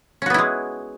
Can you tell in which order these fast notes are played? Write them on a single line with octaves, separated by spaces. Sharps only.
C#4 F#4 B3 E4 G#3